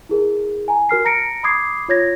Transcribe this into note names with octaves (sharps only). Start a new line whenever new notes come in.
E4 G#4 A#4
G#5 A#5
F#4 A#4 F6 C7
A5 A#5 A#6 C#7 D7
B5 C6 D6 D#6 G#6 C7
F4 C#5 G#6 A#6